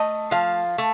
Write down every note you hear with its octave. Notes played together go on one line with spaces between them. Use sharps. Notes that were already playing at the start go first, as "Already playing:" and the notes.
Already playing: A3 D#5
F3 F5
A3